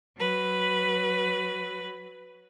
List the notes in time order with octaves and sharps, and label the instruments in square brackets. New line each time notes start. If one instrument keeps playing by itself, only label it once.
[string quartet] F#3 B4